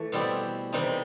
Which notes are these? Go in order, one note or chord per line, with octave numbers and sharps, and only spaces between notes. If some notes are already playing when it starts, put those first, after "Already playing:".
Already playing: E3 A3
B2 G3 C4 E4 G4
C3 E3 G3 C4 D#4